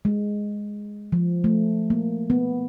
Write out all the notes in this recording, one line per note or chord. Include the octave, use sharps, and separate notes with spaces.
G#3
F3
A3
A#3
B3